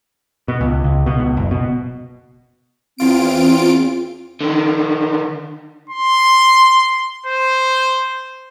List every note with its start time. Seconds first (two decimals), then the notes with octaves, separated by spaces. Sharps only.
0.48 B2
0.61 C#2
0.84 C#2
1.06 B2
1.20 C#2
1.37 F#1
1.51 B2
2.98 E2 C4 F4 D7
4.41 D3 D#3
5.90 C6
7.26 C5